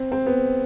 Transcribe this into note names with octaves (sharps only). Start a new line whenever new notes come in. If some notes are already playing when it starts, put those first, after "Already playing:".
Already playing: C4
C4
B3